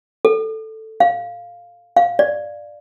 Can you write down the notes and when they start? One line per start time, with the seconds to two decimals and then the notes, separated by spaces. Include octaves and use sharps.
0.25 A4
1.00 F5
1.96 F5
2.19 D5